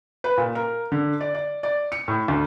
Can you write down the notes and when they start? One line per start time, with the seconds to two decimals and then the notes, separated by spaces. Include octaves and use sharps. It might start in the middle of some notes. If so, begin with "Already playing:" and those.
0.24 B4
0.37 A#2
0.55 A#4
0.92 D3
1.20 D5
1.34 D5
1.63 D5
1.92 C#7
2.08 A2
2.28 D2